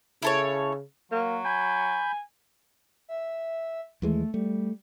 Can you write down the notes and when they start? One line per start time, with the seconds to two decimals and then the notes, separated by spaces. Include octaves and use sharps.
0.22 C#3 E4 A4 C#5
1.12 F#3 A#3
1.45 G#5 B5 G6
3.08 E5
4.02 D#2 E3 G#3 A3
4.34 G3 A3